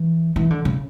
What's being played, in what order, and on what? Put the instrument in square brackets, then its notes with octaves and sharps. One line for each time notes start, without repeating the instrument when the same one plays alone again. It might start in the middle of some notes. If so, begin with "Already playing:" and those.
Already playing: [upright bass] E3
E3
D3
C#3